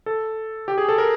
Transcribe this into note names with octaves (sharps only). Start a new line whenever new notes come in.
A4
G4
G#4
A4
A#4